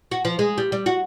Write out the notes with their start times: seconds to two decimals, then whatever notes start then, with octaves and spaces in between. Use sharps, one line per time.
0.11 F#4
0.25 F3
0.39 G#3
0.58 G3
0.72 G3
0.86 F#4